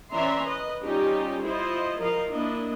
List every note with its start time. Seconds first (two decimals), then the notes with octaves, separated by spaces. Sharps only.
0.12 E3 C#4 D5 E5 A#5 C6
0.47 B4 D#5
0.84 G3 C#4 D#4 F4 G4
1.44 E4 F4 C5 D#5
2.00 F3 A#4 D#5 F5
2.31 A#3 D4 E4 D#5